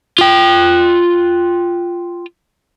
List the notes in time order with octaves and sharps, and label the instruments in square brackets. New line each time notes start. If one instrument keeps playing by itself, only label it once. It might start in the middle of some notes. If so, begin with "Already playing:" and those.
[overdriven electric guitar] F4 G5